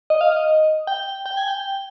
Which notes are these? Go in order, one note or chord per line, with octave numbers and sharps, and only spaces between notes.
D#5
F5
D#5
G5
G5
G#5
G5